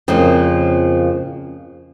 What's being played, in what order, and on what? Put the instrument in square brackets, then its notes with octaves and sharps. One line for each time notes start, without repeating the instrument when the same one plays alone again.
[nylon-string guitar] F2 C#3 F3 A#3